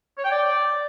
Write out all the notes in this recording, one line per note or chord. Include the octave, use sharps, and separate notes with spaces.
C#5
G5
D5